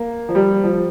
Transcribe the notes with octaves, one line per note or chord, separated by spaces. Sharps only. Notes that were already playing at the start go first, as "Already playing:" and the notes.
Already playing: A#3
F3
G3
F3